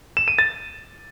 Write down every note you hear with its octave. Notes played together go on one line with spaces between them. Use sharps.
E7
D#7
A6